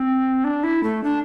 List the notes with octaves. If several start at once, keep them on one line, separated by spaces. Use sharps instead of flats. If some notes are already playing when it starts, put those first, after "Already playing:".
Already playing: C4
D4
E4
A3
D4